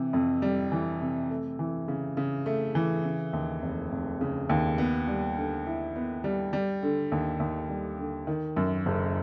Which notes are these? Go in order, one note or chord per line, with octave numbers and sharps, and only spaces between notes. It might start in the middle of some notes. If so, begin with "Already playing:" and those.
Already playing: C3 E3
F2
G3
E3
C3
A3
E3
C#3
C#3
A3
E3
C#3
D#2
F1
F1
C#3
D#2
B3
G3
D3
E4
B3
G3
G3
D3
D#2
D#2
G3
D3
D#3
F#2
F#1